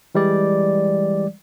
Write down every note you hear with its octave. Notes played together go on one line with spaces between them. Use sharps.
E3 G3 G#3 D5